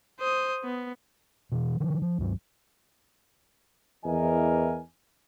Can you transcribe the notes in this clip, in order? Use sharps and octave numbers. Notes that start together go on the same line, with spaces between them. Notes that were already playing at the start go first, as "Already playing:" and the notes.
C5 D#6
B3
B2 E3
D3 D#3 F3
F3
C#2 G2 F#3
E2 E3 A#4 D#5 G#5